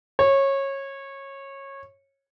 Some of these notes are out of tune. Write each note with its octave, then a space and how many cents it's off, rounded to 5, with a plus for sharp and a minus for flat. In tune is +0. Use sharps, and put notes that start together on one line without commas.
C#5 -20